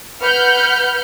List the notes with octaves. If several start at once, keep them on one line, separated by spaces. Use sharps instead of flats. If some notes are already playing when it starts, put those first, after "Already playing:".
B4 F#5 B5 F6 G6